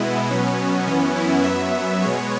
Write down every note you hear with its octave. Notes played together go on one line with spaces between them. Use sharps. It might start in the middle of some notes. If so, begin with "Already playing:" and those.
Already playing: B2 G#3 B3 E4
B2 F#3 B3 C#4
F#2 E3 B3
E4
F#2 F#3 B3 E5
B2 G#3 B3 C#5